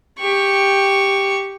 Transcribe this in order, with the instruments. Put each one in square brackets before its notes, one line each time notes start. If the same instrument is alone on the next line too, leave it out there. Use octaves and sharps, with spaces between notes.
[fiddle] G4 C#6